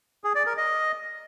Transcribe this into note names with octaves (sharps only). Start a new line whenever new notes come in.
G#4
D5
A#4
D#5